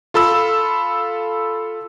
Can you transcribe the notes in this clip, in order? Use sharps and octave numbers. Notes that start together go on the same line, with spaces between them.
F4 A4 B5 E6